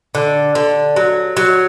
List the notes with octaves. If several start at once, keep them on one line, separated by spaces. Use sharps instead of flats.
D3
D3
F#3
F#3